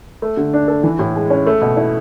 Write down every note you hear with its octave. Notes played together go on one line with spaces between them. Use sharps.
A3
D3
D4
A4
E3
A2
G#3
C#4
A3
B2
E4